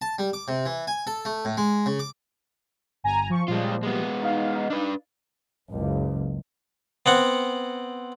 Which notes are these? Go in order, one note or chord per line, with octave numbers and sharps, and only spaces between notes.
A5
G3
D6
C3
E3
G#5
A4
A3
A2
G#3
C#3
D6
G1 G#5 A#5
F3 C#6
A#2 F3 G3 G#3 F4
G#3 B3
D#4 F5
D4 B4
F#1 C#2
B3 C4 F#5